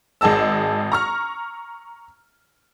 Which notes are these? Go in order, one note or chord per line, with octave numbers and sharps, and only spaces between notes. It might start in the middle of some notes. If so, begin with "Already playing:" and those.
G#1 G#4 D#5 A5 E6
A#5 C#6 F6